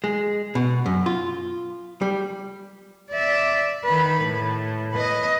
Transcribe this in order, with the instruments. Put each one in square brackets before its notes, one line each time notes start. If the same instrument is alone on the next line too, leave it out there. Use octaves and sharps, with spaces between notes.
[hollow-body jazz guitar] G#3
B2
F#2
F4
G3
[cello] D5 E5
D#3 B4
A2
B4 D#5